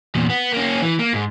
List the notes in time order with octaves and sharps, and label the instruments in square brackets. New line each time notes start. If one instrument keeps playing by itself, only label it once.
[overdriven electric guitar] E2 A#2
B3
A#3 C#4
E3
A#3
G#2